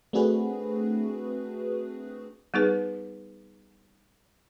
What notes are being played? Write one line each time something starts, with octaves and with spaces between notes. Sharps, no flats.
A3 C4 D4 F#4 G#4 B4
G3 B3 D#4 G#4 B4